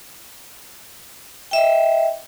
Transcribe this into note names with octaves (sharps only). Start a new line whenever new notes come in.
D#5 E5 G5